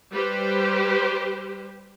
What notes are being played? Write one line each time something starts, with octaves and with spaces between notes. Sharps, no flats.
G3 G4 B4 C5